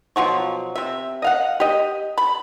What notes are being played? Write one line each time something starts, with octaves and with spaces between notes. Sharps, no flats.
B2 F3 F#3 C#6
C3 E5
D#5 F5 F#5
G4 D#5
B5